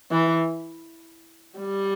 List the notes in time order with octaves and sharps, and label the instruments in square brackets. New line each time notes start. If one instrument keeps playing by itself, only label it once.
[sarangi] E3
G3